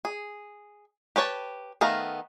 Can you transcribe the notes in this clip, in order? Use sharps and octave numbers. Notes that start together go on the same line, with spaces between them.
G#4
G4 B4 C#5 A5
D#3 A3 B3 F5 A#5